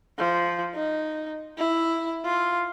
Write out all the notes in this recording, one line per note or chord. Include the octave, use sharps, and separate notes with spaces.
F3
D#4
E4
F4